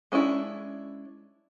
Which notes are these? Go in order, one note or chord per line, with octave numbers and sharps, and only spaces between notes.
G#3 C#4 D4 E4